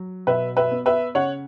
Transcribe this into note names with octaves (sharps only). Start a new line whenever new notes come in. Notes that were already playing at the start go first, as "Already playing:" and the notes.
Already playing: F#3
B2 B4 E5
B4 E5
B3
B4 E5
C#3 C#5 F#5